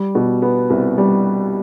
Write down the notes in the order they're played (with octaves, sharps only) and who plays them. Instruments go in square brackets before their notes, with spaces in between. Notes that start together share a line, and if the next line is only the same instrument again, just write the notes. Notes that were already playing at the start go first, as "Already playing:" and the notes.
Already playing: [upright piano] G3
B2
B3
C2
G3